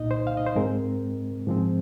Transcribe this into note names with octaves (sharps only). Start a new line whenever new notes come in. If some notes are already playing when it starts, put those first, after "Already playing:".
Already playing: C2 A#2 A#3 D#4 D#5
C5
F5
D#5
C5
G#2 G#3 C4 A#4
G#2 F3 G#3 C4